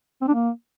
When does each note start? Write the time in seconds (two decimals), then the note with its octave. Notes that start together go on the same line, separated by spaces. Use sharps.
0.21 C4
0.28 D4
0.34 A#3